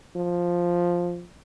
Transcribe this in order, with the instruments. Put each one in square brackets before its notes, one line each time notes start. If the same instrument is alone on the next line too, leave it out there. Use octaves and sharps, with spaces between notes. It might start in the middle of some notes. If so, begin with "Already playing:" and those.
[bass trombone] F3